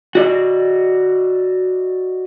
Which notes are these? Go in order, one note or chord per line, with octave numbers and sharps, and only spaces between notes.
F#4 D5 D#5